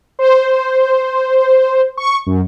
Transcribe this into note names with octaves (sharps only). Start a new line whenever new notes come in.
C5
C#6
F#2